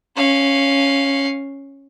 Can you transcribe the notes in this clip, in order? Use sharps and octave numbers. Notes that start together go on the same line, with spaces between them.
C#4 F5